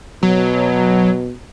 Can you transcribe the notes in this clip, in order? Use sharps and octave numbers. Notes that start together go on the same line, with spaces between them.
B2 F#3